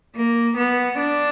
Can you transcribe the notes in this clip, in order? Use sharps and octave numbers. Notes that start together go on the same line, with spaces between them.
A#3
B3
D4